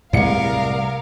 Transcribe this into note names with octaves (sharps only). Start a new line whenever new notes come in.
C2 A2 G#3 A#4 F5 C#7